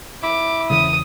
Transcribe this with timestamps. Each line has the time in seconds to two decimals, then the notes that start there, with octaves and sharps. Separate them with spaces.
0.23 E4 D6
0.70 E1 C#3 E3 D#6